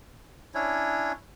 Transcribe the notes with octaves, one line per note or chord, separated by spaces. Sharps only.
C#4 D4 E4 C#5